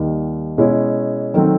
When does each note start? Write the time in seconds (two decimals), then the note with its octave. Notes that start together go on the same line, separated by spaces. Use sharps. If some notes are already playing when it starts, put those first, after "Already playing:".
Already playing: D#2 D#3 G3
0.58 B2 G#3 C#4 E4
1.34 D#3 F#3 A3 C4 D#4